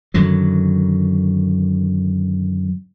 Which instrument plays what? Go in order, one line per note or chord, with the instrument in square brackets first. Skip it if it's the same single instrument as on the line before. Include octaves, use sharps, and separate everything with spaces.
[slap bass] F#2 D3 D#3 F#3